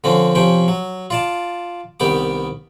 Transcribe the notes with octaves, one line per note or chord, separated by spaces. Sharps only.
D3 F3 C4 C#4
C3 F3 C#4 G5
F#3
F4 D5 A5
C2 D#3 B3 G4 D6